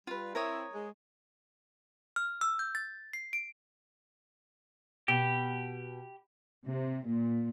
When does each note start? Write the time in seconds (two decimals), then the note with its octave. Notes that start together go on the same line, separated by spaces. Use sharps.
0.07 G3 F4 B4
0.35 C4 E4 A#4 C#5 D#6
0.72 G#3
2.16 F6
2.41 E6
2.59 G6
2.75 A6
3.13 C7
3.33 D7
5.08 B2 G4
6.66 C3
7.07 A#2